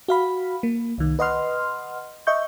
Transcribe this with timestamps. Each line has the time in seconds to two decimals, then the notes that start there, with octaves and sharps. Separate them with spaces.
0.08 F#4 F5 B5
0.63 A#3
0.98 C2 D#3
1.19 B4 D#5 F#5 C6 F6
2.27 D#5 E5 C#6 G6